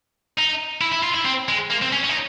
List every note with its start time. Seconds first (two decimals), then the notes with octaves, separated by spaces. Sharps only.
0.38 D#4
0.81 E4
0.93 E4
1.04 F4
1.15 E4
1.25 C4
1.49 G#3
1.70 A#3
1.82 C4
1.92 C#4
2.03 C#4
2.09 D#4